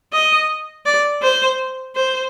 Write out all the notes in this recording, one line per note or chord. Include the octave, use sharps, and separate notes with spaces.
D#5
D5
C5
C5